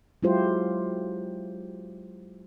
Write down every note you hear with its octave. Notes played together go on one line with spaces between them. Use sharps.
F#3 G#3 E4 F4 G4 C5